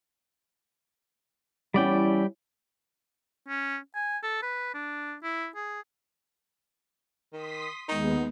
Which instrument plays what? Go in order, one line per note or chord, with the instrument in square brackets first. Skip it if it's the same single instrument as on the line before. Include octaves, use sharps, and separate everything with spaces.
[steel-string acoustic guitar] E2 C#4 E4 [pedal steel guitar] G3 D5 G5
[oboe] C#4
G#5
A4
B4
D4
E4
G#4
[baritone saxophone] D#3 [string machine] C6 D#6 B6
[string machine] D#2 G#3 B3 [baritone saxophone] D#4